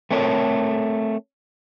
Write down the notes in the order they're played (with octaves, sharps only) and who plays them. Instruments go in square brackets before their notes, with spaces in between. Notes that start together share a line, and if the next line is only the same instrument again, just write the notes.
[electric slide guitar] A3 C4 A4 A#4 C#5